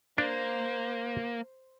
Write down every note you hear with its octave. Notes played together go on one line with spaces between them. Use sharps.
A#3 D4 C5